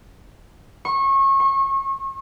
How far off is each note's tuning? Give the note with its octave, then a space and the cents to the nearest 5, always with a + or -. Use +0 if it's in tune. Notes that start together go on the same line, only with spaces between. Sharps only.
C#6 -30
C#6 -40